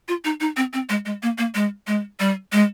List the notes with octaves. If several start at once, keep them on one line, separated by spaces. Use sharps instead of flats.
F4
D#4
D#4
C4
C4
G#3
G#3
A#3
A#3
G#3
G#3
G3
G#3